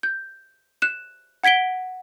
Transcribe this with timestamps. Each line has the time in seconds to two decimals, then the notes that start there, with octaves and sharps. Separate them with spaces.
0.03 G6
0.82 F#6 E7
1.44 F#5 G#6 B6 D7 G7